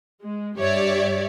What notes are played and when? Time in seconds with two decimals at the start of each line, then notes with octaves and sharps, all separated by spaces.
0.22 G#3
0.58 G2 G4 C#5 D5 E5